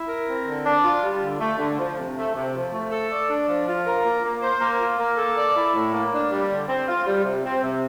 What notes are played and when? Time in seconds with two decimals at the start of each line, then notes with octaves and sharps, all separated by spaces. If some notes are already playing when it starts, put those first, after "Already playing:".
Already playing: E4
0.08 A#4
0.27 C4
0.47 D3
0.65 D4
0.83 F4
1.03 G3
1.22 D3
1.40 A3
1.59 D3
1.79 F3
1.97 C3
2.15 A3
2.35 C3
2.54 F3
2.72 A3
2.91 A4
3.11 D5
3.29 D4
3.47 F3
3.67 F4
3.86 A#4
4.04 A#3
4.24 A#3
4.42 C5
4.60 A#3
4.79 F4
4.98 A#3
5.17 A4
5.37 D5
5.55 E4
5.74 A2
5.92 A#3
6.12 D4
6.31 G3
6.50 D3
6.68 C4
6.88 F4
7.06 G3
7.24 C3
7.44 C4
7.63 C3